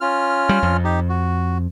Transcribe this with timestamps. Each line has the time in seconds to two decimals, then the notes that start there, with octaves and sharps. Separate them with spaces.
0.01 C#4 F4 F6
0.49 G3
0.63 F2
0.84 D#4 G4
1.09 F#4